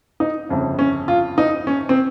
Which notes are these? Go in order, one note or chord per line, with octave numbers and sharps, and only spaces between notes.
D#4
G1 F2 C#3
C#4
F4
D#4
C#4
C4